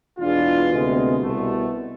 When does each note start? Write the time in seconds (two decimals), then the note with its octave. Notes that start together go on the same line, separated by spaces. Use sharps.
0.19 E2 B2 G#3 D4 F4
0.69 D2 C3 G#3 B3
1.19 C2 B2 A3